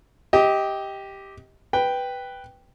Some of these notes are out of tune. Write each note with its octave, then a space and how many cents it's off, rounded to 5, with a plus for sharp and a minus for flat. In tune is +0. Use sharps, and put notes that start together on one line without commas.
G4 +0 D#5 +25
B4 +0 G5 +0